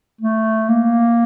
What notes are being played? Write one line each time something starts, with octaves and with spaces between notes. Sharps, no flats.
A3
A#3